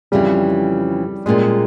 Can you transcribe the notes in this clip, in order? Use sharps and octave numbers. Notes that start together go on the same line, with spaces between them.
F2 C#3 E3 G3
A#2 G3 G#3 C#4